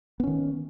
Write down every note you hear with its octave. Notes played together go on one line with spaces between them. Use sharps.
D#3 B3 C#4